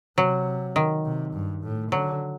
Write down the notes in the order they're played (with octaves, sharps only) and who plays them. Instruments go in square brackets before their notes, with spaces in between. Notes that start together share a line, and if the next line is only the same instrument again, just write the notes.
[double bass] C3 [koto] F#3
[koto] D#3
[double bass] C3
G2
A2
[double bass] D3 [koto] F#3